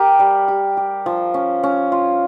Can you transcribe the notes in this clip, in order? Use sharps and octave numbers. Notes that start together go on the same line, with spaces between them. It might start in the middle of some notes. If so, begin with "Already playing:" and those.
Already playing: G4 A#4
G3
G4
G4
F3
C#4
C#4
F4